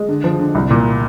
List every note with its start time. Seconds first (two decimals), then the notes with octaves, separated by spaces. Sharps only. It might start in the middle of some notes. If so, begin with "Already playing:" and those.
Already playing: G#3
0.09 D3
0.24 F3
0.40 D3
0.55 C2
0.71 A#2